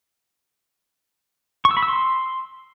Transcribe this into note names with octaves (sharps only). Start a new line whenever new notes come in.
C#6
E6
B5
E6
C6